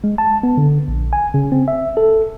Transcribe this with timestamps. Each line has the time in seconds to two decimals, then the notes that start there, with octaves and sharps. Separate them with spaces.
0.04 G#3
0.18 A5
0.43 B3
0.58 D3
0.88 A#1
1.13 G#5
1.34 C#3
1.52 C4
1.68 E5
1.97 A4